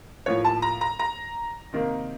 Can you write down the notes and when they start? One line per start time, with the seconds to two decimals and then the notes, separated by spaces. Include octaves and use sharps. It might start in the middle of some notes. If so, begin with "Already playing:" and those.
0.26 A2 F3 A#3 C#5
0.45 A5
0.62 A#5
0.81 A#5
0.99 A#5
1.73 C3 D#3 A#3